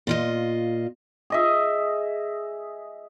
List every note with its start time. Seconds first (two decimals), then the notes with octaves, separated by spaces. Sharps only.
0.07 A#2 F4 D#5
1.30 G#4 D#5 E5